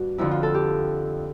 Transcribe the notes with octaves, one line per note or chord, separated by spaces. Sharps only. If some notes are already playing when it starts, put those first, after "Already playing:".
Already playing: G2 B3 F#4
F2 D3 F3 E4
F4
A4
G4